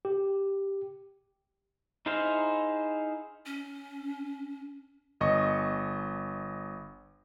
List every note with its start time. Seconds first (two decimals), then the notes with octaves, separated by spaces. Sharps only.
0.05 G4
2.06 D#4 E4 G#4 C5 F5
3.46 C#4
5.21 G1 D#5 C#6